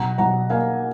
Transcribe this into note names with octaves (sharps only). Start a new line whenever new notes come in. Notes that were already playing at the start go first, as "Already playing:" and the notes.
Already playing: B1 F#5 A#5
B1 F#5 A#5
A#3 F5 G#5